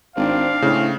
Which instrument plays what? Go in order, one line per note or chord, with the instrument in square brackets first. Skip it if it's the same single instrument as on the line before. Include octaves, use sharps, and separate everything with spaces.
[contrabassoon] G#1 [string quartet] C4 D4 [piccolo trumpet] F5
[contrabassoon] A2 [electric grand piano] C#3